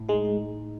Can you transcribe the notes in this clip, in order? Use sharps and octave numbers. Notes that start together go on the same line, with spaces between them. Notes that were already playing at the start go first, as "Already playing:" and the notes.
Already playing: A2
G#3 D#4
D#4